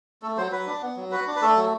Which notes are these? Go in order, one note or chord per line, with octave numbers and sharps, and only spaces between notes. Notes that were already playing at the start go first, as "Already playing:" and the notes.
A3 A4
F#3 C5
F#3 B4
D4
B3
F#3
F#4 B4
D4
B4
A3 A4
F#3